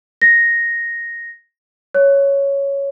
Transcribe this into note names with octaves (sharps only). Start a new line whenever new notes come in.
A#6
C#5